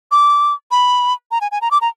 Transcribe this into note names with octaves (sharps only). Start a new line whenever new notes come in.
D6
B5
A#5
G#5
G#5
A#5
D6
A#5